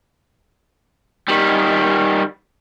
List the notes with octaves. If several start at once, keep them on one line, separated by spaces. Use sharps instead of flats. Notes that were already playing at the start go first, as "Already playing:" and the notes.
D#3 G3